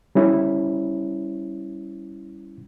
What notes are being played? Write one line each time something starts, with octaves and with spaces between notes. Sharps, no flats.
G3 C#4 E4